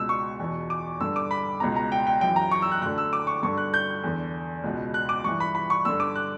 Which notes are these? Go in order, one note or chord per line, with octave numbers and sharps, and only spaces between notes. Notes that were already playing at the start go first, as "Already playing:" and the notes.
Already playing: C#2 B2 E6
C#6
E2 B2
D6
G2 D3 E6
D6
B5
C#2 B2 A#5
A#5
G5
G5
F#2 E3 G5
A#5
C#6
E6
F#6
D2 D3 F#6
E6
D6
C#6
G2 D3 C#6
F#6
G6
E2 D3
C#2 B2
F#6
D6
G2 E3 C#6
B5
B5
C#6
G2 D3 E6
D6
F#6